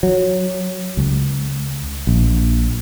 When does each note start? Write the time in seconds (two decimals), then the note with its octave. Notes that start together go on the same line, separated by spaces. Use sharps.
0.03 F#3
0.97 C#2
2.07 A#1